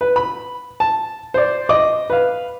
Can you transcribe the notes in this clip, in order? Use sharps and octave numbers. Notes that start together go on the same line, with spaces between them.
B4
B5
A5
C5 D5
D#5 D6
B4 F5